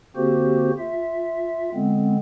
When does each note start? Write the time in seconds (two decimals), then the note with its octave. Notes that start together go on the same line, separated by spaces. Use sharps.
0.16 D3 A#3 C4 F#4 G4 C5
0.79 F4 E5
1.74 D3 G#3 B3 C4